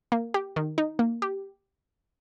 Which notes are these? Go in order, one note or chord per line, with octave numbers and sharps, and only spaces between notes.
A#3
G4
D#3
D#4
A#3
G4